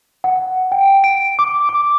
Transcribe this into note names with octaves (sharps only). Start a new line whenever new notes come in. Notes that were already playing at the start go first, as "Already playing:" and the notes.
F#5
G5
D7
D6
D6